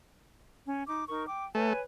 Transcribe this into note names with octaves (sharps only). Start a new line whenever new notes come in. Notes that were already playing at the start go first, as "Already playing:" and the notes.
C#4
D#4 D6
D#4 A#4 C#6
G5 D6
A3 B4 C#5 G#5